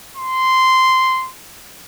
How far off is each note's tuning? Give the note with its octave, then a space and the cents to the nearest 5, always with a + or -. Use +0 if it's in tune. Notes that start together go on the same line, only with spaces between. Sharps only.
C6 -10